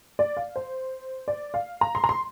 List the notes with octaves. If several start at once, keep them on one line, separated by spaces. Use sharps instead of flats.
D5
F5
C5
D5
F5
A#5
C6
A#5
C6